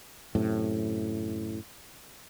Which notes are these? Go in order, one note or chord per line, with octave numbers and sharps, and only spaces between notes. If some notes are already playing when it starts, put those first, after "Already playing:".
F#2 A2 C3